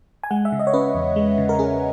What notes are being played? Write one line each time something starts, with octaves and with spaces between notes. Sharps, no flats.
G#5
G#3 F#5
E5
C#3
D#5
C#5
C#4 B4
E2
G#3
C#3
A#4
C#4 G#4